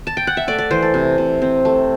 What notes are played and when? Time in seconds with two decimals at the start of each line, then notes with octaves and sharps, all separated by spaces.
0.07 A5
0.17 G5
0.27 F#5
0.37 E5
0.48 A3 D5
0.58 D5
0.71 E3 C5
0.83 A4
0.94 C3
1.18 C3
1.42 C4
1.65 A3